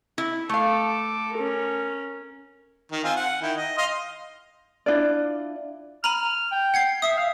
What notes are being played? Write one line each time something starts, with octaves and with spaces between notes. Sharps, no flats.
E4
A3 A4 F5 D6
C#4 A#4
D#3
C4 F4 G#5
F#5
D#3 E4 G5
D#5
D#5 F5 C6
D4 E4 F4 D5
A#5 B5 F6 D#7
G5
F#5 G#6 C7
E5 D#6 C7
F5